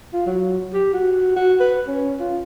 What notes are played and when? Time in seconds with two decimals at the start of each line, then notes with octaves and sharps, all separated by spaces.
0.13 F4
0.26 F#3
0.74 G4
0.93 F#4
1.36 F#4
1.60 B4
1.87 C#4
2.20 F4